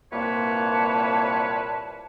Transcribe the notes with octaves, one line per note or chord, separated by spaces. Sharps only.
C2 A#2 A#3 B4 C#5 A5